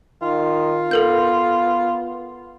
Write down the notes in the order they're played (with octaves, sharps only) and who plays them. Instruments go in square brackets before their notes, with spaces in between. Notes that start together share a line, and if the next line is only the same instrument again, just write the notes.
[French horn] D#3 [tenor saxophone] F4
[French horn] B3 [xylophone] A4 A#4 G6